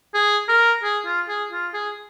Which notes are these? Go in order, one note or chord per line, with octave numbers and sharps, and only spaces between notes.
G#4
A#4
G#4
F4
G#4
F4
G#4